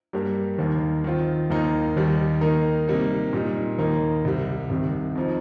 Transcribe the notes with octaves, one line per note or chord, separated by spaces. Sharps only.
G2 G3 A#3 G4 A#4
D#2 D#3 A#3
D#3 C4 F4
D#2 D#3 A#3 D#4 A#4
D#2 D#3 G3
D#3 A#3 D#4 A#4
C3 G3 A#3 D#4
A#2 G3 D#4
D#2 D#3 A#3 D#4 A#4
C2 C3 G3
C2 C3 D#3
F2 F3 D#4